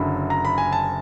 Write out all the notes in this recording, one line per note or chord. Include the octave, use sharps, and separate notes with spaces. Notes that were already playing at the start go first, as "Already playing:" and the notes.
Already playing: F#1 F#2 D3 B5
A#5
B5
G#5
A5